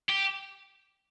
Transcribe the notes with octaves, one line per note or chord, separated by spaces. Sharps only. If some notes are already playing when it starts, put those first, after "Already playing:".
G4